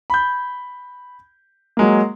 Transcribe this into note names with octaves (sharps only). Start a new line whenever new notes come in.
B5 G6
F#3 G#3 A#3